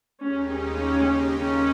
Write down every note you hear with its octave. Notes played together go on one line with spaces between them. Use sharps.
D#2 C#3 G#3 C#4 D#4 G4
C#4
C#4
C#4